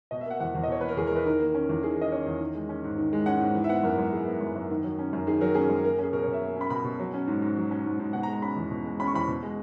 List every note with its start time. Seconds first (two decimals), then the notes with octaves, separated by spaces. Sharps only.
0.11 B2 D#5
0.21 E5
0.26 A#3 F#5
0.40 E2 F#5
0.55 E2
0.64 D#5
0.68 B2 C#5
0.81 A#3 B4
0.89 A#4
0.97 E2 G#4
1.07 A#4
1.12 E2 B4
1.26 D#3 A#4
1.40 A#3
1.54 C#4
1.69 E2
1.83 D#3 G#4
1.97 A#3 D#5
2.12 C#4 C#5
2.26 E2
2.40 D#3
2.55 G#3
2.69 C#4
2.84 G#2
2.98 D#3
3.13 G#3
3.26 C#4 F#5
3.41 G#2
3.55 E3
3.64 E5
3.69 B3 F#5
3.83 F#2 A#4
3.98 F#2
4.12 E3 G#4
4.27 B3
4.41 F#2
4.56 F#2
4.70 D#3
4.84 F#3
4.99 C#4
5.13 F#2
5.27 D#3 G#4
5.41 F#3 A#4
5.54 C#4 G#4
5.69 F#2
5.84 A#3 A#4
5.99 C#4 G#4
6.12 B2 A#4
6.23 C#5
6.27 B2
6.33 E5
6.41 A#3
6.56 C#4 B5
6.70 B2 B5
6.84 B2
7.00 F#3
7.14 C#4
7.28 G#2
7.42 G#2
7.56 F#3
7.71 C#4
7.86 G#2
7.99 G#2
8.13 B2 F#5
8.23 A#5
8.28 G#3
8.33 A#5
8.42 C#4 B5
8.57 E2
8.71 B2
8.86 G#3
9.00 C#4 B5
9.07 C#6
9.14 E2 B5
9.28 B2
9.43 G#3